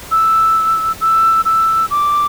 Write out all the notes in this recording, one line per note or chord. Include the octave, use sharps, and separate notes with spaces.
E6
E6
E6
D6